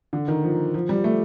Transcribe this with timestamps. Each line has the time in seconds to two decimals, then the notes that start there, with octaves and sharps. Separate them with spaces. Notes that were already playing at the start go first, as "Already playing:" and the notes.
0.13 D3
0.28 D#3
0.43 F3
0.74 F3
0.89 G3
1.04 A3